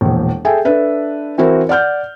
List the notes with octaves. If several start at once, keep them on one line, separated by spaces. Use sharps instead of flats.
E1 A#1
G#4 A4 E5 G5 G#5
D4 A4 B4 E5
E3 C4 E4 F#4 A#4 C5
D5 F#5 F6 G6